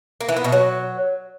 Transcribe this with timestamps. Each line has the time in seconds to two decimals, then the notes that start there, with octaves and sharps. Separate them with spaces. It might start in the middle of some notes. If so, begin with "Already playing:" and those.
0.21 A#3
0.29 E3
0.36 B3
0.44 B2
0.52 F#3